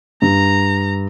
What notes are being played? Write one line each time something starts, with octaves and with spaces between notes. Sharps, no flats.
G2 A#5